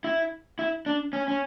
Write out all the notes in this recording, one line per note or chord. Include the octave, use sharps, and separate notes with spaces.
E4
E4
D4
C#4
C#4